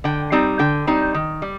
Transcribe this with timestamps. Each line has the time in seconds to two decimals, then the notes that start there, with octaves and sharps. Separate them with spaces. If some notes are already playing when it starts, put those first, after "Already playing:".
0.04 D3 G5
0.32 G3 C4 D#4
0.59 D3 G5
0.87 G3 C4 D#4
1.14 D#3
1.42 G3